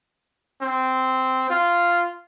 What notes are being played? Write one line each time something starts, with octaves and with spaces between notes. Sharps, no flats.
C4
F4